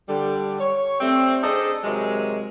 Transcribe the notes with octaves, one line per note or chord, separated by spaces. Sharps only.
D3 G3
C#5
G3 A3 C4
D4 G#4 A4 C5 D#5
C3 D#3 F#3 G#3